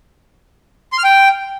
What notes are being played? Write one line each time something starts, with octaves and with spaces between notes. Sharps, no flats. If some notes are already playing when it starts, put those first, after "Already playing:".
C6
F6
G5